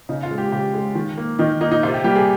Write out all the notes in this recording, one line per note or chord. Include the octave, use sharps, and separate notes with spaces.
C#3 D#4
F4
G#3
G4
C#3 G4
G#3
D#3
A#3
D#3 D#4
A#3 D#4
D#4
C3 F4
G4
G3 A#3 G4
G#4